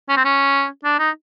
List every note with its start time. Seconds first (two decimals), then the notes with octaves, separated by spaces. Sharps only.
0.09 C#4
0.17 C4
0.25 C#4
0.85 D4
0.99 D#4